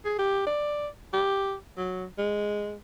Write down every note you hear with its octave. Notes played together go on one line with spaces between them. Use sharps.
G#4
G4
D5
G4
F#3
G#3